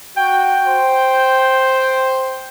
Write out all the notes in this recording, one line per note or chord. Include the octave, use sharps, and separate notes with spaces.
F#4 G5
C5